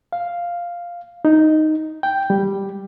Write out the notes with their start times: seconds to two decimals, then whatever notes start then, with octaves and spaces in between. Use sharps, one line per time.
0.13 F5
1.25 D#4
2.03 G5
2.30 G3